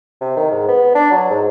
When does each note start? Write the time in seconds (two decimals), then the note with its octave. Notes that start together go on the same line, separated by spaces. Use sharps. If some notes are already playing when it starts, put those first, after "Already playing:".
0.21 C3
0.37 D#3
0.51 G#2
0.68 B3
0.95 D4
1.11 F#3
1.30 G#2